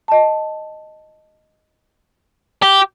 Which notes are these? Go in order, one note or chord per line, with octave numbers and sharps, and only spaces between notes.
D#5 A5
G4